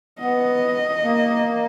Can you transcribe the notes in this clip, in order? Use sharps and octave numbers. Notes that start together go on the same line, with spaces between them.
B3 D#5
A#3